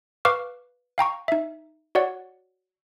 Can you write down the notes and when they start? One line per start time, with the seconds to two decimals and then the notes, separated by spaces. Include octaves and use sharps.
0.25 B4 F5 C#6 D6 F6
0.98 F5 G5 A#5 C#6
1.28 D#4 E5
1.95 F#4 C#5 D5 F#5